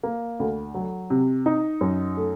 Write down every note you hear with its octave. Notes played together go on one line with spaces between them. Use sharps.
A#3
D2
F#3
C3
D#4
F#2
A3